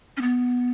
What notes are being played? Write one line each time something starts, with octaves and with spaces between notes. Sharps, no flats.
C#4
B3